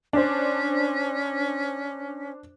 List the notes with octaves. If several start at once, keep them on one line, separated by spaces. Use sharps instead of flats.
C#4 D4 C5